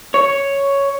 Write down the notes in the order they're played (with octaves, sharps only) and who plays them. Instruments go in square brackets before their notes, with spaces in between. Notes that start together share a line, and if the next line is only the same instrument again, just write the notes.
[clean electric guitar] C#5